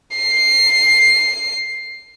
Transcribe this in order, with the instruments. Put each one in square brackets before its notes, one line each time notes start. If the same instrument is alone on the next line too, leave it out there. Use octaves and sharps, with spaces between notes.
[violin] C7